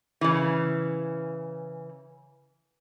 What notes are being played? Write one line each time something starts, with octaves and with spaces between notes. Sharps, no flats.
C#3 E3